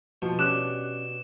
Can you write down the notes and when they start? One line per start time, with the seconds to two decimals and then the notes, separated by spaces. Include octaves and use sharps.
0.22 B2 F3
0.39 C#4 D4 G4 D6 F#6 E7